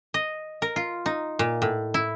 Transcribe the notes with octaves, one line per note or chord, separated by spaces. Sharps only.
D#5
A#4
F4
D#4
A#2
A2
E4